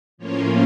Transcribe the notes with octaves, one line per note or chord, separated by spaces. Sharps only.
A2 F3 A#3 C#4 F4 C#5